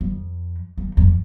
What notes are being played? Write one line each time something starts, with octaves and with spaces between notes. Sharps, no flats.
F2
E2
F2